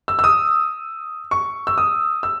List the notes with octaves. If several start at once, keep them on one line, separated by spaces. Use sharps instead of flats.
E6
E6
D#6
C#6
E6
D#6
E6